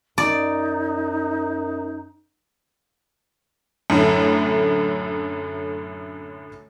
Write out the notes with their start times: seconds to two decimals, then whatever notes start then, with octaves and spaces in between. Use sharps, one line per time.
0.18 F#2 D#4 D5
3.90 F#2 A2 D3 A3